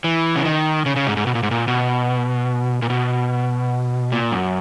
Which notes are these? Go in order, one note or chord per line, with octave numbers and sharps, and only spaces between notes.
E3
C#3
D#3
C#3
C#3
G#2
G#2
B2
A#2
G#2
A#2
B2
A#2
B2
A#2
F#2